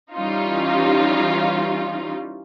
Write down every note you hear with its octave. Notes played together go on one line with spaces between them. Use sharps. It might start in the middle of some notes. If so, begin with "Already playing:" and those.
E3 G3 C#4 D#4 F4